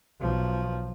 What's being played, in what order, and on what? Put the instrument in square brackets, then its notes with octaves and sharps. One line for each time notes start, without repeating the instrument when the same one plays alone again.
[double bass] B1 F3